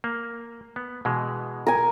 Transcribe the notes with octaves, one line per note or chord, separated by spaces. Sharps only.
A#3
B3
B2 E3 G#3
A#4 G#5